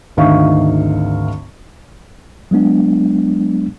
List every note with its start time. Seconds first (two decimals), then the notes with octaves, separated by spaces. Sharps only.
0.17 G#1 D2 D#4 E5 F5 C#6
2.51 F#3 G#3 B3 D4